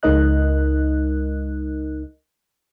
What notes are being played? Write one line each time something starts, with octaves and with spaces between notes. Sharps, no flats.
C#2 G#3 D#4 A#4 D#5 F#6